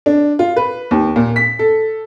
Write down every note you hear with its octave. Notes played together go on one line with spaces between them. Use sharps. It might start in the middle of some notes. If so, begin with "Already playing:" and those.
D4
F4
B4
D#2
A#2
B6
A4